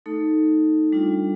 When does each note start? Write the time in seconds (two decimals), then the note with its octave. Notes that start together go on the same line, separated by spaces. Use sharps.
0.06 A3 D#4 A4
0.92 G3 D4 F4